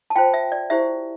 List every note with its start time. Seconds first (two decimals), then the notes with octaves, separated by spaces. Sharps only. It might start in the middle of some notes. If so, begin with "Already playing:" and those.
0.10 A5
0.16 F4 C5 G5
0.34 E5
0.52 D5
0.70 E4 G4 C5 E5